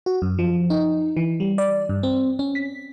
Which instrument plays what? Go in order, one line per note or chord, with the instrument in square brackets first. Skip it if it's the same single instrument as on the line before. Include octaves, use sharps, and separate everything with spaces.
[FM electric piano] F#4
F#2
F3
D#4
E3
G3
D5
G2
C4
C#4
B6